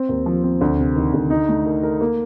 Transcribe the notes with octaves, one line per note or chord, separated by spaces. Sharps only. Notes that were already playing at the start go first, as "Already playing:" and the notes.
Already playing: C4
D#2
F3
C4
D2
C3
D#3
D2
D#4
A3
A#4
A#4
A#3